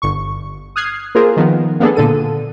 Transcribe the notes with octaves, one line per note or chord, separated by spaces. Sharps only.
G1 C#6
D#6 F6 F#6 G#6 C7
A#3 F4 G#4 A#4 C5
D#3 F3 B3
A#3 B3 D4 G#4 A4
A#2 D3 A4 D#7